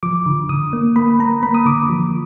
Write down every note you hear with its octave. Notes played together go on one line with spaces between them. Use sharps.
F3 D6
D3
D3 D#6
A#3
A#3 B5
A#3 A#5
A#3 B5
D#6
D3 D6
F3